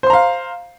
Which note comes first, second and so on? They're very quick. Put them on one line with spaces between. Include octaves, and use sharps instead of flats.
C5 C6 A#5 F5